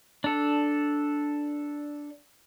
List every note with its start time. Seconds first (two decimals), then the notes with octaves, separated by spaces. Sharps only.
0.24 D4 A4